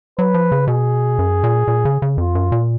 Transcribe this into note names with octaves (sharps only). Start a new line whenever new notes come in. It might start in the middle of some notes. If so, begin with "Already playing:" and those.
F#3 B4
F3
C#3
B2 G#4
F#2
A#2
A#2
C#3
C#3
F2 F4
F#2
A#2